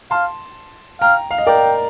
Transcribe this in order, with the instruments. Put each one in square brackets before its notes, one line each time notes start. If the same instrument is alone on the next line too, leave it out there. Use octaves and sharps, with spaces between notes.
[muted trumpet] F5 [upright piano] A5 C6
[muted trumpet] F5 [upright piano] G5 A#5
[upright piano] F5
D#5
[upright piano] A#4 D5 [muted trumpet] G5